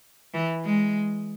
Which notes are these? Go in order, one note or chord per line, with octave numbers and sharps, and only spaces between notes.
E3
G#3